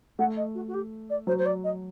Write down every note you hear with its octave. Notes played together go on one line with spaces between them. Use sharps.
A3 F#5
D#5
F#4
F#4
G4
D5
F#3 C5
C5
D5
D#5